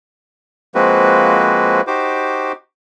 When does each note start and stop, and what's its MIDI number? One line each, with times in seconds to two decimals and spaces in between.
0.75 1.81 53
0.75 1.81 56
0.75 1.81 58
0.75 1.81 60
0.75 1.81 66
0.75 1.81 71
1.87 2.52 63
1.87 2.52 66
1.87 2.52 67
1.87 2.52 72
1.87 2.52 86